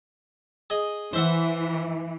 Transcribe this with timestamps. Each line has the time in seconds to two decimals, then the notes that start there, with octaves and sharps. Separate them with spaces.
0.70 G#4 D#5
1.13 E3 C5 E5 F#5